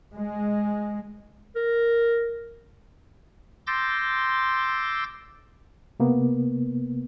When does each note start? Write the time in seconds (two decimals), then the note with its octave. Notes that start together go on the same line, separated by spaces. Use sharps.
0.13 G#3
1.56 A#4
3.67 C6 D6 E6 G6 A6 A#6
6.00 C3 A#3 B3